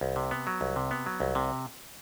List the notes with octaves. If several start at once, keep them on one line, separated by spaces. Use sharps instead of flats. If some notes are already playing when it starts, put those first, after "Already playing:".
C2
C3
B3
F#3
C2
C3
B3
F#3
C2
C3